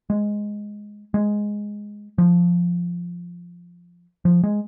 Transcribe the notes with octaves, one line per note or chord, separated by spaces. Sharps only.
G#3
G#3
F3
F3
G#3